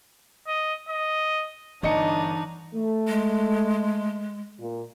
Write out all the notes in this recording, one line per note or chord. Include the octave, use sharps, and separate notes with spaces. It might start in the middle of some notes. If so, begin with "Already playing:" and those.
D#5
D#5
G1 E3 D4 D#4 D#5 C#7
A3
G#3
A#2